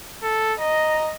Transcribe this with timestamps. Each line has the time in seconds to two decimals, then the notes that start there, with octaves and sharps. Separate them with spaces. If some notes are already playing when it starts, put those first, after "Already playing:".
0.24 A4
0.60 D#5 A#5